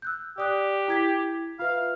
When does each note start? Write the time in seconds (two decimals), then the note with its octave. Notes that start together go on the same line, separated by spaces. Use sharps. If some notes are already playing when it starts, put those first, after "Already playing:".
0.02 E6 F#6 G6
0.38 G4 D5 D#6 F#6
0.88 E4 G#6 B6
1.59 F4 B4 E5 F5